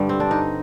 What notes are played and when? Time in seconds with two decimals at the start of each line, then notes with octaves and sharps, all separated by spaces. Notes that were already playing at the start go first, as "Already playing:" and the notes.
Already playing: G2 D3 G3
0.09 C4
0.20 D4
0.31 D#4